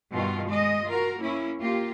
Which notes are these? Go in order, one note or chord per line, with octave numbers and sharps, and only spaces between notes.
G2 B2 D#3 G3 F4
G#3 D#5
F4 F#4 A#4
A#3 C#4 E4
A#3 F4 G4